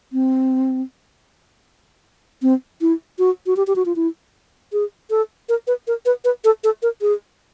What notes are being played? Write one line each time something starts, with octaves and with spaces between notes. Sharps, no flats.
C4
C4
E4
F#4
F#4
G4
G4
F#4
F4
E4
G#4
A4
A#4
B4
A#4
B4
B4
A4
A4
A#4
G#4